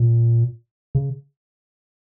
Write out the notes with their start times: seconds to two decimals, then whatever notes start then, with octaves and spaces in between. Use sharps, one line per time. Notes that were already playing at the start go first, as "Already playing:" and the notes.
Already playing: A#2
0.95 C#3